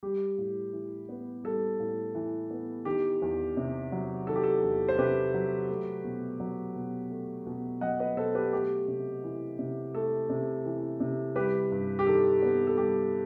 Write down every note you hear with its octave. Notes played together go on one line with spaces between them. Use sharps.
G3 G4
A2
E3
B3
G3 A4
A2
E3
B3
D#3 G4
E2
C3
F#3
D#3 A4
G4
A4
E2
C5
C3 G4 B4
F#3
A3
B2
F#3
B2
A3
B2
F#3 D#5 F#5
B4 D#5
B2 A4 C5
G4 B4
A3 G4
C3
E3
C3
A3 A4
C3
E3
C3
G3 G4 B4
G2
G4
D#3 A4
B3
A4
G3 G4